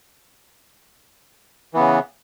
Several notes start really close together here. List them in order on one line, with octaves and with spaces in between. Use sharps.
E3 B3 C#3